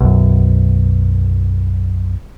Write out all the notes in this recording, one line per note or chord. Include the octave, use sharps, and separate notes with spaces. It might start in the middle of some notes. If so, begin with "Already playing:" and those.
B1 F#2